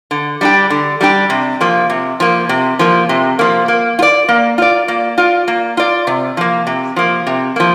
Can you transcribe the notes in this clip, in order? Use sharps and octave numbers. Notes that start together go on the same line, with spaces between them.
D3
G3 D4 G4
D3
G3 D4 G4
C3
F3 A#3
C3
F3 A#3
C3
F3 A#3
C3
F3 A#3
A#3
F4
D5
A#3
F4 D5
A#3
F4 D5
A#3
F4 D5
C3
F3 A#3
C3
F3 A#3
C3
F3 A#3